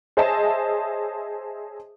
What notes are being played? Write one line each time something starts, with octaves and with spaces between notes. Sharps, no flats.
G#4 C5 C#5 D#5 E5 A5